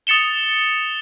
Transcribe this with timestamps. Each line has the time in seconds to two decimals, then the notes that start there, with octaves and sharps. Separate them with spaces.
0.07 D#6 A6 C#7 E7 G7